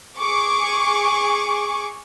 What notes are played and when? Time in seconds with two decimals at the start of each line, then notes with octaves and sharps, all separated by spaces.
0.19 G#4 C#6 D6